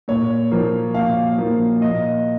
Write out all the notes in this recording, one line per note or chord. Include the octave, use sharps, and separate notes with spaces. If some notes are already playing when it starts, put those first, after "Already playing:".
A#2 C#5
F3 A#3
A#2 F5
F3 A#3
A#2 D#5